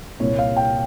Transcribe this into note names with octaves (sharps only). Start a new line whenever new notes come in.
C2 A#2 G3 C4 E4 C#5
F5
G5